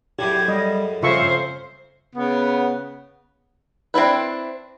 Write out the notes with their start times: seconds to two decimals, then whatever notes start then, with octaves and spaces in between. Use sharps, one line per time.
0.19 F#2 A2 C#3 G4 G#6
0.48 G3 D#5
1.03 F2 C#3 F4 C5 E5 C#6
2.15 C#3 B3
3.94 C4 D4 E4 B4